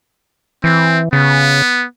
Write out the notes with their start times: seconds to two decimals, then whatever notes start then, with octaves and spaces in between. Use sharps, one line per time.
0.64 E3 C4
1.13 C#3 B3